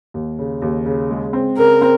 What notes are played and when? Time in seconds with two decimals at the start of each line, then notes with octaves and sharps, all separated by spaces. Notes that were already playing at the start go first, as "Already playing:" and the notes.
0.14 D#2
0.39 C#3
0.62 D#2
0.86 C#3
1.11 G#3
1.33 C4
1.58 C#3 A#4
1.82 C4